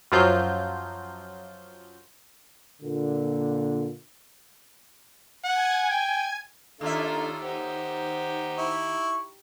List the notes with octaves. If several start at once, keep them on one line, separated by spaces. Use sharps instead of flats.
F#2 F3 F#3 F4 G6
A#2 D3
F#5 G#5 G#6
G5
D#2 A3 A#3 D4 D#4 F4 A4 E5
D#4 G4 C5 F#5
E4 C#6